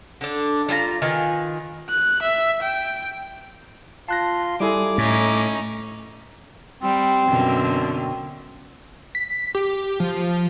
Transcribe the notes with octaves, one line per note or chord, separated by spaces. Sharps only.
D3 D4
G3 F4 G#5 A#5
D#3 F4 B4 G#5
F#6
E5
G5
F4 A5 C6 F#6 A#6
G3 E4 G#4 A4 D6
A2 A3 C#4 D#4
G3 C4
F#2 B2 D3
B6
G4
F3